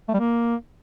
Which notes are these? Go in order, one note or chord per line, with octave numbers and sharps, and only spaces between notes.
A3
G3
A#3